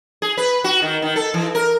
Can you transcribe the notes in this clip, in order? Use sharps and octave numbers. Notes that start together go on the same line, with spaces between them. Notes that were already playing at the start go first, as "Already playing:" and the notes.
G#4
B4
F#4
D#3
D#3
A4
E3
A#4